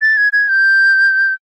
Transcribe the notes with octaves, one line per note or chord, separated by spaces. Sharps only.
A6
G#6
G#6
G6